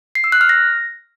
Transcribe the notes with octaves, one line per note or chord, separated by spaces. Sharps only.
C7
E6
F#6
F6
A#6